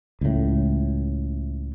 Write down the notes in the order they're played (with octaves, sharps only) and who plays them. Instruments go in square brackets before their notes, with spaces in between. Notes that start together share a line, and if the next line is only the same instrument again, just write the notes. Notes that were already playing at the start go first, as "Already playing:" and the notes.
[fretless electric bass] C#2 A2